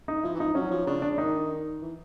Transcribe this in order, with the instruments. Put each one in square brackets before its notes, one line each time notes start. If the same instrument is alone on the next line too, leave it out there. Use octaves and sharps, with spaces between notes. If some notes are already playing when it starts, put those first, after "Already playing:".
[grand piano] D#4
[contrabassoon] F3 [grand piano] E4
[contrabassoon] E3
[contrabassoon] F3 [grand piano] D#4
[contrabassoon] F#3 [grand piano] C#4
[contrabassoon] F3
[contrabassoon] C#3 [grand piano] D4
[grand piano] D4
[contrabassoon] D#3 [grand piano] D#4
[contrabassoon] E3